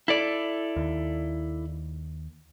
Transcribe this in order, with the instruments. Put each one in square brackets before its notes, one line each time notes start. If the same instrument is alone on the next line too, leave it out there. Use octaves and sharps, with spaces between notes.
[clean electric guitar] E4 A4 D5
[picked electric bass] D#2